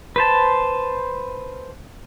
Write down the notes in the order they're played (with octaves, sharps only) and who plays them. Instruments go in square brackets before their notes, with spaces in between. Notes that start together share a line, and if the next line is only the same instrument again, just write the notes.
[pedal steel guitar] B4 C5 A5